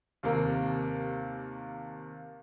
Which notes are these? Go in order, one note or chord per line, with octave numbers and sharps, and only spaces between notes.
D#2 C3 A#3